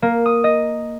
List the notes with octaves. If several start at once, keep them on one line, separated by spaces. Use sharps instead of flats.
A#3
D#6
D#5